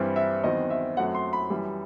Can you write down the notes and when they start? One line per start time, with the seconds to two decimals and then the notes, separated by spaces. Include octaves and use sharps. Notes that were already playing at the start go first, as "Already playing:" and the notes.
Already playing: G2 E3 G3 C4
0.16 E5
0.44 E2 D#3 F#3 C4 D#5
0.70 E5
0.97 F#2 F#3 A3 C4 F#5
1.15 C6
1.33 B5
1.50 F#2 E3 G3